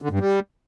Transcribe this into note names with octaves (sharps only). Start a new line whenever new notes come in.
D3
G2
G3